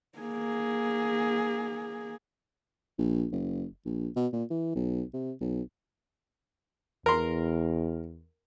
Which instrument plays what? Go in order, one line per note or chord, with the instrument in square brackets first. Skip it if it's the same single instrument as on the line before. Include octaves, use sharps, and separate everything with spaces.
[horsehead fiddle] A#3 G#4
[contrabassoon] A#1
F#1
A#1
B2
A#2
E3
B1
C3
B1
[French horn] E2 [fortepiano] A#4 C6